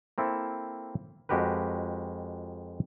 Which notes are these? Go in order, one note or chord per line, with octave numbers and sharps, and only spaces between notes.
A#3 C4 E4 A4
F2 G#3 F#4 G4 A#4 B4